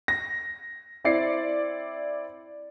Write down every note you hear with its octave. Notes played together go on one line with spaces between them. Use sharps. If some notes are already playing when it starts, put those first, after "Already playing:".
A#6
C4 E4 D5 C7 C#7